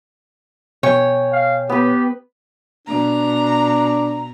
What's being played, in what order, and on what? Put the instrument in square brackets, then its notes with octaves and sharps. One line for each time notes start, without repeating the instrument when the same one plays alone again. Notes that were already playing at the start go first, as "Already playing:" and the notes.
[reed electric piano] B2 G5 G#5 [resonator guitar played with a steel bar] C#5
[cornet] F5
[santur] B3 B4 [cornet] G4
[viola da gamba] B2 [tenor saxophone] D4 [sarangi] A#5